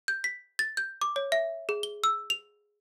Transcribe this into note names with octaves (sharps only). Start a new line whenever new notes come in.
G6
B6
A6
G6
D6
C#5
E5
G#4
G7
E6
F7